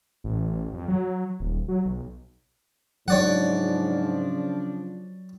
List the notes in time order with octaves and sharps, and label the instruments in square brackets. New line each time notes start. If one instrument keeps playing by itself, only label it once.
[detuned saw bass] A1
F2
F#3
D#1
F#3
B1
[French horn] G#2 [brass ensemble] C#3 F3 D4 [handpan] F#3 [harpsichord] C#5 D5 F#5